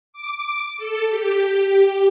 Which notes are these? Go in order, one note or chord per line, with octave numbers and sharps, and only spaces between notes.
D6
A4
G4